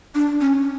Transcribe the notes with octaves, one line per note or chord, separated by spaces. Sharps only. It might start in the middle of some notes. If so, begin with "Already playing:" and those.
D4
C#4